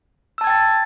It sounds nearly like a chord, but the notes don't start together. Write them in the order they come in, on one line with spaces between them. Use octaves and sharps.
E6 A5 G#6 G5 A6